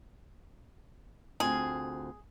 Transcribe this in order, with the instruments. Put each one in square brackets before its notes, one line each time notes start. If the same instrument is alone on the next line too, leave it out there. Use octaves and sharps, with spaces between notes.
[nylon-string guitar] D2 C4 F4 [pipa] G#4